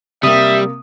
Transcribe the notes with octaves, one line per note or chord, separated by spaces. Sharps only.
C3 G3 A#3 E5 D#6